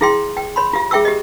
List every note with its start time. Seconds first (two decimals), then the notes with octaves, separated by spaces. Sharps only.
0.01 E4 G#4 F5 G5 C6
0.37 G5
0.56 C#5 B5 C6
0.73 F4 G4 F5
0.91 G#4 E5 G5 C#6 E6
1.05 G4 D#5